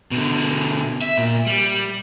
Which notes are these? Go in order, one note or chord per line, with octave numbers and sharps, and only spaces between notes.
B2 D3
E5
A#2
G3